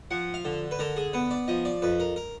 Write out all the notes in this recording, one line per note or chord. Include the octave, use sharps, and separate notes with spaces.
F3 F#5
F5
D3
B4
D3 A#4
G#4
B3 B4
D5
F3 D#5
D5
F2 B4
A#4
A#4